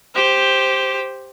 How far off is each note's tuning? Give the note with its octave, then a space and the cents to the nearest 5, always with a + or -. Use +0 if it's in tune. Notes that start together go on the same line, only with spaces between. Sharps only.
G4 +0 C5 +0